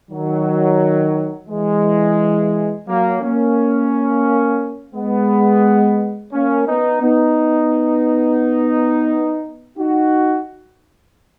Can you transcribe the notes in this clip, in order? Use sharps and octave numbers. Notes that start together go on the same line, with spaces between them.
D#3 F#3
E3 G#3
F#3 A#3
A#3 C#4
G#3 B3
A#3 C#4
B3 D#4
B3 D#4
D#4 F#4